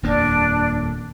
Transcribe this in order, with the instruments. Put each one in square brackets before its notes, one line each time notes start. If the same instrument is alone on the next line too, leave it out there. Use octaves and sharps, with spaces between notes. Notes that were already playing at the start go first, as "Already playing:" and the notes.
[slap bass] D#1 F2 A#3 [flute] D4